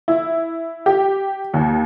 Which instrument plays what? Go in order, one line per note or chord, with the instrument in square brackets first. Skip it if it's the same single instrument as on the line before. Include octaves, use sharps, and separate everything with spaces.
[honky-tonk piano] E4
G4
D#2